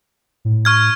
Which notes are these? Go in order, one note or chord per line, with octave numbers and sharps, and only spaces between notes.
A2
C#6 F6 G#6